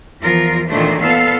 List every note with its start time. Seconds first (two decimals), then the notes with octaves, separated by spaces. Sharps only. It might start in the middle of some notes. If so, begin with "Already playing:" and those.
0.22 E2 F3 F4 A#4
0.69 A#2 D#3 E3 A3 D4 C5
1.00 A#2 B3 A4 F5